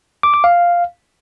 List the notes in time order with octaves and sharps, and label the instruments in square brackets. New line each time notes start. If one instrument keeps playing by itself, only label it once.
[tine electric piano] D6
D6
F5